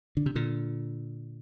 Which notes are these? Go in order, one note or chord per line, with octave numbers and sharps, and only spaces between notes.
D3
C3
A#2 D3